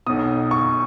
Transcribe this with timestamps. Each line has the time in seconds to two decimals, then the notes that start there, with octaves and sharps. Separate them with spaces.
0.06 B1 B2 D#6
0.51 C#6